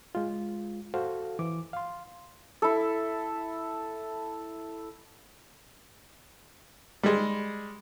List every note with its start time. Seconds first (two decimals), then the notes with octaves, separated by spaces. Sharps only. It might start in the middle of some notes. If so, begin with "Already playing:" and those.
0.15 G#3 F4
0.94 F#4 A4 C5 F5
1.39 E3 D6
1.73 F5 C6
2.62 E4 A4
7.03 G3 G#3